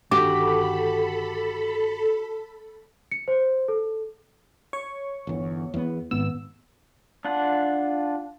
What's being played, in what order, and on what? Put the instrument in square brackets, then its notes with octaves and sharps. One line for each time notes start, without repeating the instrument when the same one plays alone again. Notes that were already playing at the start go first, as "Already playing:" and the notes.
[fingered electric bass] G1 D#3 D4 [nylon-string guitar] F#4 G4 [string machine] A4 B5 [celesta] D6
[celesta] C#7
C5
A4
[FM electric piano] C#5 C#6
[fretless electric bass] G1 E2
E2 B3
[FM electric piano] G#1 E6 [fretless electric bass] B3
[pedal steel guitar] D4 F4 F#5